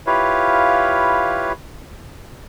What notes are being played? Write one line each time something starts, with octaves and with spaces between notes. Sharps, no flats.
E4 F4 G4 B4 C#5 F5